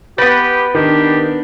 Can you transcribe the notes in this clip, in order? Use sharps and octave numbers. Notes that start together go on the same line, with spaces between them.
B3 G4 B4 A6
D#3 D4 G4